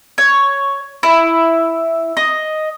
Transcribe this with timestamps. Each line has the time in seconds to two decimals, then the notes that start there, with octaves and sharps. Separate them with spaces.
0.18 C#5
1.03 E4
2.17 D#5